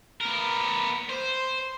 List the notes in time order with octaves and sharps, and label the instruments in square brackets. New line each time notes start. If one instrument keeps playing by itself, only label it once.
[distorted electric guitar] B3 A#4
C5